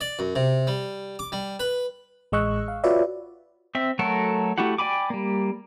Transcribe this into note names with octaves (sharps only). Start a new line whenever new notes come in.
D5
F#2
C3
G3
D6
G3
B4
A1 G#3 D#5 C#6 E6 F#6
F5
F4 F#4 B4 C#5 D5 E5
C4 E5
F#3 A3 F#4 A4 A#4
A3 E4 F#4 G4 F#5
D5 G5 G#5 B5 D6
G3 A#3